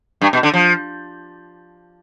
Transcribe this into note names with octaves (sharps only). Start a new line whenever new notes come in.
G2
B2
D3
F3